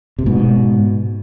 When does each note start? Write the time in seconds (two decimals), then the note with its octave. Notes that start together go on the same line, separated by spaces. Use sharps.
0.19 C3
0.26 G#2 B2